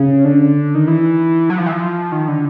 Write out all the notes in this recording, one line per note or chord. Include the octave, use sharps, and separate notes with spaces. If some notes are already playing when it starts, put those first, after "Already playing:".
Already playing: C#3
D3
D#3
E3
F#3
F3
E3
F3
D#3
D3